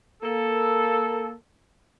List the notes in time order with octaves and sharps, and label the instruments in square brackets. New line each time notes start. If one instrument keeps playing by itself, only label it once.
[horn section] A#3 A4